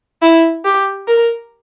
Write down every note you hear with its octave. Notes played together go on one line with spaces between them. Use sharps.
E4
G4
A#4